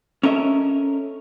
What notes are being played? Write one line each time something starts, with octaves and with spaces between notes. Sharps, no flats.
C#4 A4 A#4 D#5 E5